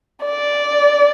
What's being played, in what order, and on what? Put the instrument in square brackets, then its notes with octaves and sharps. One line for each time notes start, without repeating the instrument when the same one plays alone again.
[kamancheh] D5